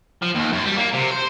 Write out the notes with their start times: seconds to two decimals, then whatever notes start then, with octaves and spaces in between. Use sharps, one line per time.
0.22 F3
0.35 D#2
0.53 F#2
0.66 G3
0.77 A#3
0.93 C3
1.10 C5